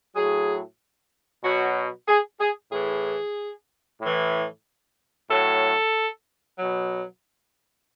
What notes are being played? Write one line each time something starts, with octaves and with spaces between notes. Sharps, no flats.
A2 F#3 G#4
B2 F#3 F#4
G#4
G#4
A2 E3 G#4
A2 E3
A2 F#3 A4
B2 F#3